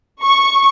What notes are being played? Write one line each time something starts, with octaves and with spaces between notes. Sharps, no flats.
C#6